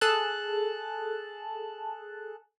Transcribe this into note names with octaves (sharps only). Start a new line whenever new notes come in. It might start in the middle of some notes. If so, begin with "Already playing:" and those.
G#4 A4 A5 F#6